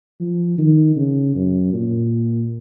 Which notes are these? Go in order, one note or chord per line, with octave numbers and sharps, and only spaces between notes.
F3
D#3
C#3
F#2
A#2